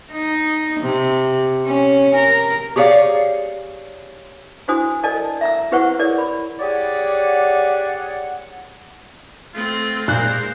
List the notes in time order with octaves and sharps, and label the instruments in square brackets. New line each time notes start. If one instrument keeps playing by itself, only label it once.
[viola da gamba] D#4
C3
C#4
A#4
[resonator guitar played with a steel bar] G4 G#4 C#5 D5 F5
[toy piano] D4 E4 F#4 C5 G#5 D#6
A4 A#4 D5 D#5 G#5 A5
E5 A#5 E6
E4 G4 B4 C5 F#5 C#6
E4 G#4 A#4 C#5 D5
B5
[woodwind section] G4 G#4 C#5 D5 F#5
[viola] A3 C4 [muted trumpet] F4
[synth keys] A#2 [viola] G#3 A#4 [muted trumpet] C5 [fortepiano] F#6